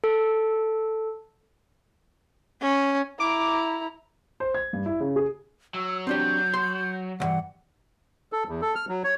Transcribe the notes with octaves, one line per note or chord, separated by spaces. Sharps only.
A4
C#4
E4 A#5 D6
C5
G#6
G2
E4
C#3
G#4
F#3 E6
C4 D4 G4 G6
C6
D2 G2 E3 F#5
A4
E2
A4
F6
F#3
C#5